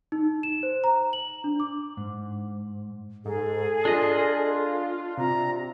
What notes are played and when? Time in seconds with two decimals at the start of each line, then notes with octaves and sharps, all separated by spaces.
0.12 D#4
0.43 E7
0.63 C5
0.84 A#5
1.13 F#7
1.44 D4
1.60 D6
1.97 G#2
3.25 G#2 G#4 A4
3.85 D4 F4 D#5
5.18 C3 F4 A#5